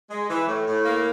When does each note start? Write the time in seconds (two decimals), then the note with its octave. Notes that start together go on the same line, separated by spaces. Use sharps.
0.11 G#3
0.30 E3
0.48 A2
0.67 A2
0.85 A#3